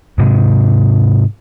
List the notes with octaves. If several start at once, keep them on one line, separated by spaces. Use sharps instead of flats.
G#2 C3 G#3